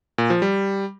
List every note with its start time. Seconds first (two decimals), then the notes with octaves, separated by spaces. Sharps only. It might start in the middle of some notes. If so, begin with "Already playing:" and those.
0.18 A#2
0.30 F3
0.42 G3